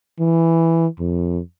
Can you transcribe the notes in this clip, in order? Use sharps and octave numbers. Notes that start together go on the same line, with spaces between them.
E3
F2